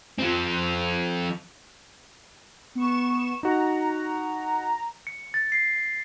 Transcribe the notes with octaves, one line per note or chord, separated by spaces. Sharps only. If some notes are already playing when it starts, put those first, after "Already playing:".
F3 C4
B3 C#6 E7
D#4 F#4 A#5
C#7
A6
C7